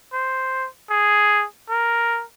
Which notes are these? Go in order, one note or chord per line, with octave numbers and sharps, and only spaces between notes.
C5
G#4
A#4